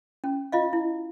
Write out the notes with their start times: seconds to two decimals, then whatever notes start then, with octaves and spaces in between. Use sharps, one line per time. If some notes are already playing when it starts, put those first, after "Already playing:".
0.24 C#4
0.52 F4 D#5 F5
0.73 E4